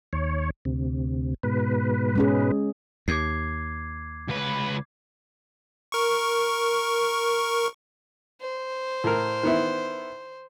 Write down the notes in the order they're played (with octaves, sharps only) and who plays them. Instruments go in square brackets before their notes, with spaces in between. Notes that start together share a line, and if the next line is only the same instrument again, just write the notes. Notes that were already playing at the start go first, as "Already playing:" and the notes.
[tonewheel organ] D#2 C#5
D2 C3
G#2 B2 B4
[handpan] G#3 C#4 G#4
[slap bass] D#2 [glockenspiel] D6 G#6 C7
[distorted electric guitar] C#2 B4
[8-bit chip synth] A#4 C#6
[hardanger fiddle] C5
[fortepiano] A2 A#4
D#3 B3 E4